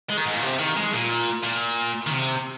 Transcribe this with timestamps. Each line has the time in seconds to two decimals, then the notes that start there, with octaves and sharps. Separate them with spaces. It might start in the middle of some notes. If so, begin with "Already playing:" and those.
0.10 G#3
0.17 D#3
0.26 G#2
0.35 A#2
0.42 C3
0.59 D#3
0.76 G#3
0.93 A#2
1.43 A#2
2.07 D#3
2.10 C3